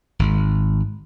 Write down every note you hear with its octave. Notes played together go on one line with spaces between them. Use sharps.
G#1